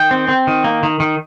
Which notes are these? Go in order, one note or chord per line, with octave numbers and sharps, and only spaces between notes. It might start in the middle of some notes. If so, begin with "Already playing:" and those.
Already playing: D#3 G5
C4
C4
D#3
A#3
D#3
D#3